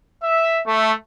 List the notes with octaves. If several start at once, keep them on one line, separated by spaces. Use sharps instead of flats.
E5
A3